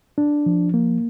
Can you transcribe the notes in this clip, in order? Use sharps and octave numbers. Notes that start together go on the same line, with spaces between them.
D4
F3
A#3